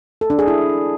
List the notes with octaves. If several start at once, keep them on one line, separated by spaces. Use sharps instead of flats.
A4
D4
G#4
E4